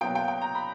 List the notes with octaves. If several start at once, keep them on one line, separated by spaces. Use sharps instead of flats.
B2 F#3 A#3 G5
G5
G5
A#5
B5